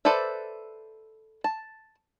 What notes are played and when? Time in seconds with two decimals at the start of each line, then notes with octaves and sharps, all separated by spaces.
0.05 A4 B4 C5 D5 E5
1.44 A5